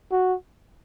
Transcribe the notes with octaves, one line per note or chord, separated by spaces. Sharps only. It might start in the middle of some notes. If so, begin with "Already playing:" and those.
F#4